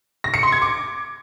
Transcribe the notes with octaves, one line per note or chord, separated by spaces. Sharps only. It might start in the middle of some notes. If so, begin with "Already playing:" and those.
A#6
C#7
C6
G#6
D6